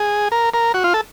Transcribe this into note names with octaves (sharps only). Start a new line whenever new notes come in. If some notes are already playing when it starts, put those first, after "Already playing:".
Already playing: G#4
A#4
A#4
F#4
F4
A4